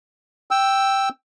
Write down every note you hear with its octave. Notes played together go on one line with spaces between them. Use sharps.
G5 E6